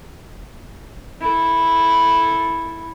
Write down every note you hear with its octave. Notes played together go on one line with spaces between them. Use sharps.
E4 A4